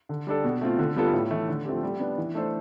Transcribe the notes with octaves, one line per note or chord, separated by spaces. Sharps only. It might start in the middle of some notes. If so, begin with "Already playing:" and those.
D3
G3 D4 A4
B2
A3 C4 F4
D3
G3 B3 F4 A4
A2
E3 A3
D3
F3 A3 C4 G4
G3
B3 D4
E3
A3 D4 A4 C5